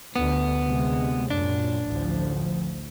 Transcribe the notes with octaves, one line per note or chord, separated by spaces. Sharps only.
D2 B3
D2 C3 G#3
F#2 A#2 D4
A1 D2 F3